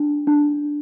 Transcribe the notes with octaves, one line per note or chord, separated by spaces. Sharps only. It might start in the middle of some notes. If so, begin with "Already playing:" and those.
Already playing: D4
D4